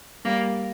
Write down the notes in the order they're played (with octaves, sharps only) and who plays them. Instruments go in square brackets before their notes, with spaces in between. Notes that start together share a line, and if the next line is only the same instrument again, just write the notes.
[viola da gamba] G3 A#3